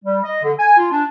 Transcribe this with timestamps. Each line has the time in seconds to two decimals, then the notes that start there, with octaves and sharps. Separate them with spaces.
0.04 G3
0.24 D#5
0.43 D3
0.59 G#5
0.77 F4
0.91 D4